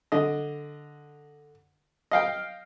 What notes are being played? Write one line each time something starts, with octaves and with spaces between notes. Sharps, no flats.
D3 D#5
D#5 F5 G5